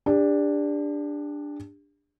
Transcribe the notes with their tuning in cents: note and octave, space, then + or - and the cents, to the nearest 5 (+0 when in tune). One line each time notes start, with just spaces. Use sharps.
D4 +0 G4 +40